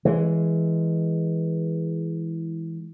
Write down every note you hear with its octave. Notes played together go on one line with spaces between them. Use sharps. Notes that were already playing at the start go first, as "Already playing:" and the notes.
E3 G#3